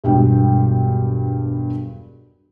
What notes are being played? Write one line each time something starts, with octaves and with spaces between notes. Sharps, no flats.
E1 B1 G2 G#3 G5